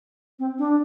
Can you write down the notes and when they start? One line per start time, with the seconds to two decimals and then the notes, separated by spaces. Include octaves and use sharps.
0.39 C4
0.59 D4